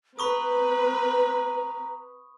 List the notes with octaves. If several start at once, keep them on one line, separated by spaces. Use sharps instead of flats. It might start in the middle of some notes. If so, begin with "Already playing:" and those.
C4 B4 A#5 B5 C#6 D#6